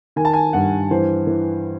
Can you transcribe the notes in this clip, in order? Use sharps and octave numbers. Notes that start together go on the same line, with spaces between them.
D#3 G#5
A5
G#5
G2 F#5
E3 C5
E3